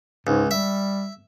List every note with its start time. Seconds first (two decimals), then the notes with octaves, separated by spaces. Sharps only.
0.27 C#2 G#2
0.51 G3 E5